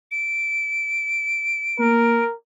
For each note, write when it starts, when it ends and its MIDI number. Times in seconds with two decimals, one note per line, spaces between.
0.11 2.24 98
1.79 2.22 58
1.79 2.34 70